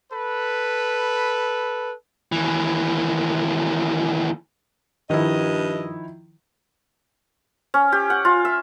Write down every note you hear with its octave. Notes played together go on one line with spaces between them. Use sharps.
A4 B4
D#2 E3
G2 D#3 F3 E4 D#5
C#4
G4
F#5
F4
E5